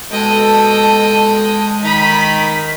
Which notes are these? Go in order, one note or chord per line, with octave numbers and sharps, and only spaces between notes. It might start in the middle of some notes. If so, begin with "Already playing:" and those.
B2 G#3 A4 D#5 G5 A5
D#3 D#4 B5 B6